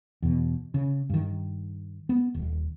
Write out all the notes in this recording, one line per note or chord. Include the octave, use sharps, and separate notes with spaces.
E2 B2
C#3
G2 D#3
B3
D#1